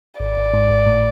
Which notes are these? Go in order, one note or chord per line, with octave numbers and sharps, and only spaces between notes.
G#1 D5
G#1
G#2
G#1
A2